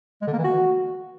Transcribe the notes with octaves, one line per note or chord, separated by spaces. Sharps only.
G#3
D3
A#3
E3
F#4